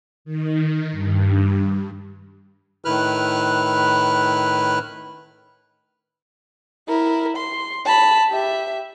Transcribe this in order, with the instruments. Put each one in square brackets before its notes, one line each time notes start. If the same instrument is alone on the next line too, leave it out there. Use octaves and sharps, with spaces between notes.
[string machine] D#3
G2
[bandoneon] A2 D#3 E4 B4 F6 F#6
[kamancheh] E4 A#4
C6
A5 B5
G4 E5